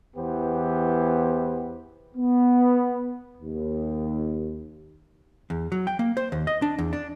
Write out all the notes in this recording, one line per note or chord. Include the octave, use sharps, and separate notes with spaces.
E2 E3 B3 G4 C5
B3
D#2
E2
F#3
G5
A#3
C5
D#2
D#5
D4
E2
D4